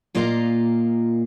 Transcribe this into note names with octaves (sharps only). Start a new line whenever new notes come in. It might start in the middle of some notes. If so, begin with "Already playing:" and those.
A#2 A#3 F4 D#5 F5 A#5